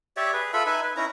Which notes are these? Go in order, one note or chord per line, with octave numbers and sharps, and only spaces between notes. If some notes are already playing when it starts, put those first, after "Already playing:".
G4 C#5 D5 E5
G#4 B4
F4 A4 E5 B5
D#4 B4 E5 G#5
B4
C#4 D#4 E4 A#5